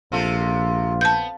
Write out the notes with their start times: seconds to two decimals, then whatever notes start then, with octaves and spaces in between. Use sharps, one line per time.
0.12 A#1 C3 F4 A4
1.01 B3 A5 G6